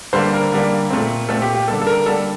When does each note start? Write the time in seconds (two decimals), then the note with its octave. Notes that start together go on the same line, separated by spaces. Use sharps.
0.13 D3 G3 A#3 C5
0.33 A#4
0.52 D3 G3 A#3
0.90 A#2 A3 C4
1.29 A#2 A3 C4 A4
1.42 G4
1.54 G4
1.67 D3 G3 A#3 A4
1.82 A4
1.87 A#4
2.06 D3 G3 A#3 A4